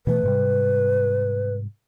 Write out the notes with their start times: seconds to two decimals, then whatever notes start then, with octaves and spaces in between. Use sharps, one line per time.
0.07 B2 E3 A3 B4
0.23 G#2 C3 G3